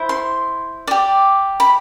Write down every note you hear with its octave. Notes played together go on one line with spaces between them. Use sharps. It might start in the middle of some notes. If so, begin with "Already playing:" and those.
Already playing: E4 C5
C6
G4 D5
B5